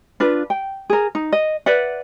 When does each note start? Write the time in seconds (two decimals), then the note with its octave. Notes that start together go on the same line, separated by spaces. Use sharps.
0.20 D4 F4 B4
0.50 G5
0.90 G#4 A#4
1.15 D#4
1.33 D#5
1.66 B4 D5 E5 F#5